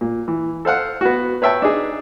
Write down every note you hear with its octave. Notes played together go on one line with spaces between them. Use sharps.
A#2
E3
A4 C5 F5 F#5
B3 F#4
B4 C#5 E5 G5 A5
D4 D#4 G#4